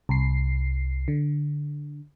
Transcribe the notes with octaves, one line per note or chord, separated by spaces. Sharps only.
C2 C7
D3